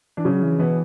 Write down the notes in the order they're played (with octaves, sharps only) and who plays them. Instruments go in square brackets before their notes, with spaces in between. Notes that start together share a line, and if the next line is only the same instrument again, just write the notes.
[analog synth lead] E3 [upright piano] D4
[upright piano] C#3 C#4 [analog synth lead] F#3
[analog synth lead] E3
[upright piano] B2 B3 [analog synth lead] E3